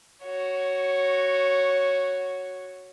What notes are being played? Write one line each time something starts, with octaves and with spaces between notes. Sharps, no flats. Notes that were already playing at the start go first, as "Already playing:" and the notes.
F#4 C#5